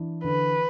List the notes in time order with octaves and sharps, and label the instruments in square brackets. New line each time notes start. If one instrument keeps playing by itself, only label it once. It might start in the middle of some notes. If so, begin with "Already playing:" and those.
Already playing: [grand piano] E3 D4
[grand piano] D3 [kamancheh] B4